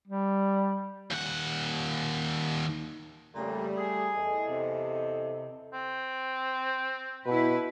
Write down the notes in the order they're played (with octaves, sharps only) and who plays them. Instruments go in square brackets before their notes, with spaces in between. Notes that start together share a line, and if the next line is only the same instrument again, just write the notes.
[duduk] G3
[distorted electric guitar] D#2 F#5
[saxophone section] F2 A#2 C#3 [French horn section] G3 A3
[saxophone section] G#4
[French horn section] E2 A4 D#5
[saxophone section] C3
[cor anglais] C4
[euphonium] B2 [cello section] E4 B4